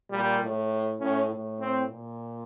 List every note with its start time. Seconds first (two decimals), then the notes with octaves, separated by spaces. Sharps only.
0.10 A#2 G3
0.41 A2
1.00 A2 C#4
1.30 A2
1.60 C4
1.89 A#2